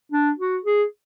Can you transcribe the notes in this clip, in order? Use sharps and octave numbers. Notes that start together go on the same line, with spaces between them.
D4
F#4
G#4